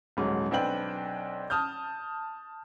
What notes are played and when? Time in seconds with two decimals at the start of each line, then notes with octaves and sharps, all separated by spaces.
0.17 D#1 G#2 F#3
0.51 B1 C4 D4 B4 G5 F#7
1.50 A5 D#6 F6 G6